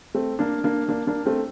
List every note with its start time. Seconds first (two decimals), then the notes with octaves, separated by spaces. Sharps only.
0.15 A3 C4
0.39 A#3 D4
0.64 A#3 D4
0.89 A#3 D4
1.07 A#3 D4
1.25 A3 C4